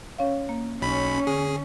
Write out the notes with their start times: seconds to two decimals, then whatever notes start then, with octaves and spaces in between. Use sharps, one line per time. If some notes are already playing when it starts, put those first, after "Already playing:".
0.18 C#4 C#5 F5
0.49 A#3
0.82 B1 C#4 B5
1.27 D3 G#4